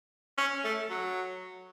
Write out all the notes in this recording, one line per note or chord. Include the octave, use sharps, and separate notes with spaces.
C#4
A3
F#3